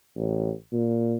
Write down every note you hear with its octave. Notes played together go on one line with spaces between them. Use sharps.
A1
A#2